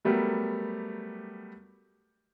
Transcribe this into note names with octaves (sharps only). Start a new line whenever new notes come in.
F#3 G3 A3 B3 G4 A#4